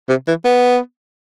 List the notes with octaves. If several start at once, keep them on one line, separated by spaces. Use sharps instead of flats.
C3
E3
B3